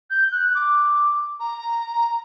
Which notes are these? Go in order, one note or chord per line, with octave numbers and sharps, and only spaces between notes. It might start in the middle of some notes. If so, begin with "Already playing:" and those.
G6
F#6
D6
A#5